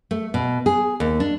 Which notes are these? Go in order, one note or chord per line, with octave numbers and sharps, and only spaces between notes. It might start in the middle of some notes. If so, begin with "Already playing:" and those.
A3
B2
G#4
D#2
D4